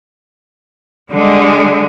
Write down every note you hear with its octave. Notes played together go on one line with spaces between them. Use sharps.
D3 G3 G#3